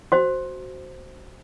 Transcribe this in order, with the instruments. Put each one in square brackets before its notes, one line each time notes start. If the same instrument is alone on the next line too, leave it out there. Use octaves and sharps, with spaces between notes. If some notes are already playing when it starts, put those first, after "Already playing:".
[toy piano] F#4 C5